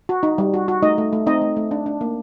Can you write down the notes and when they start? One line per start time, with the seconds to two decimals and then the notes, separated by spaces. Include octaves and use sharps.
0.09 F#4
0.23 D#4
0.38 G3
0.54 F#4
0.68 F#4
0.82 A3 D#4 D#5
0.98 A3
1.13 A3
1.27 C4 D#4 D#5
1.42 A3
1.57 A3
1.71 D4
1.86 D4
2.01 A#3